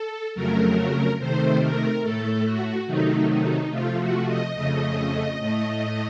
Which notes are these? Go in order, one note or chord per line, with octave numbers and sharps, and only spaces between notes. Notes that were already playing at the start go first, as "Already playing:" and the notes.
Already playing: A4
F2 C#3 F#3 A3 A#4
C3 D#3 A3 C5
A#4
A2 A3 A4
F#4
C3 D#3 F#3 A3 D#4
D#4
C3 F3 A3 F4
F#4
D#5
F2 C#3 A3
A2 A3